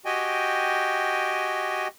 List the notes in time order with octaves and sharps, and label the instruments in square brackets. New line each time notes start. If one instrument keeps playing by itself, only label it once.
[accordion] F#4 G4 D#5 G5 G#5